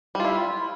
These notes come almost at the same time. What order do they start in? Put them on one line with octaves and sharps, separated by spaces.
G3 F4 E4